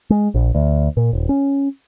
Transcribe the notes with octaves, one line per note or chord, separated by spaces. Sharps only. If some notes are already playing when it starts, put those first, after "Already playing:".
G#3
A#1
D2
A#2
D#1
C#4